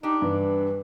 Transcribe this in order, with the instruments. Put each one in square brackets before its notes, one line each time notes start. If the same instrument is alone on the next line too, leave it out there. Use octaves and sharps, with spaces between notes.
[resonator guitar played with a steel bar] D4 G4 [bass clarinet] D#4
[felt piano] G2 [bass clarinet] E3